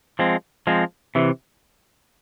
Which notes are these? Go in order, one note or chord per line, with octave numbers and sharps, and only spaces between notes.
F3 G#3 C4
F3 G#3 C4
C3 E3